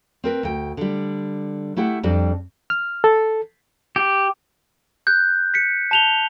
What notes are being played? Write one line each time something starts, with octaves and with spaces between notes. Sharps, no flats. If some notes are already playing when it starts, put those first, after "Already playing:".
C4 A#4 B4
D2 G5
D3 G3
A3 E4 G4 F#5
F2 G3 D4
F6
A4
G4
F#6 G6
B6 C#7
A5 F7 G7